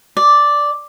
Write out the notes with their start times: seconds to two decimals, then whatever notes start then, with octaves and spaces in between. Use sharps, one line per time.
0.17 D5